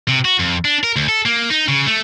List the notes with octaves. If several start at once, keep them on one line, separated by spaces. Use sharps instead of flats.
C3
F#4
F2
D4
A#4
D2
A4
A#3
D#4
C#3
A3